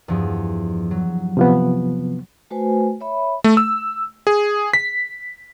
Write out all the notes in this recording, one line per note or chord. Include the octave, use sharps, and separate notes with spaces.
E2 G2 F3
F#3
C3 F3 B3
A3 F#4 B4 C5 G#5
C#5 E5 B5
A3
E6
G#4
B6